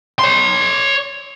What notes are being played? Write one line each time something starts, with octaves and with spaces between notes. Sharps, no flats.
C#5 C6